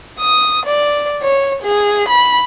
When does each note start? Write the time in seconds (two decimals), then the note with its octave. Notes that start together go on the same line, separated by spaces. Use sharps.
0.19 D#6
0.66 D5
1.22 C#5
1.62 G#4
2.08 B5